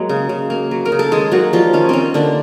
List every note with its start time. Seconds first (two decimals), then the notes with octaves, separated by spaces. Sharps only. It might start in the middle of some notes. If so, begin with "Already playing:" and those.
Already playing: F#3 G#3 A#3
0.09 C#3
0.29 C#3
0.50 A#3
0.71 F#3
0.85 A#4
0.92 C#3
0.99 A4
1.11 D#3 G#3 G#4
1.31 F#3 A#3 F#4
1.53 F3 G3 F4
1.73 D#3 C#4
1.89 D#3 C4 C#4
2.14 D3 A#3 D4